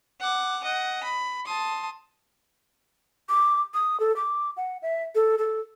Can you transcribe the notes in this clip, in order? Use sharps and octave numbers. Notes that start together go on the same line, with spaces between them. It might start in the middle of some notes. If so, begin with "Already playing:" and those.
F#5 D6
D#5 F#5
B5
A5 C6 D#6
D6
D#6
A4
D6
F#5
E5
A4
A4